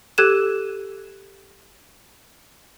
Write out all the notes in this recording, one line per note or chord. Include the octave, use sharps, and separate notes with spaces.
G4 A4 F#6 G#6 D#7 E7